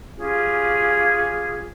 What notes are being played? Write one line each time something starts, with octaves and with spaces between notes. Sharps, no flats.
C#4 F4 G4 G#4